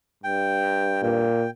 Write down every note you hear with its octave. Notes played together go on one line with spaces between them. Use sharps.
G2 G5
A#2 G5